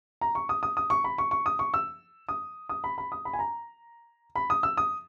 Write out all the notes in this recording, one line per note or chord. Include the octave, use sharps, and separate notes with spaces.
A#5
C#6
D#6
D#6
D#6
C#6
B5
C#6
C#6
D#6
C#6
E6
D#6
D#6
B5
B5
D#6
B5
G#5
A#5
B5
D#6
E6
D#6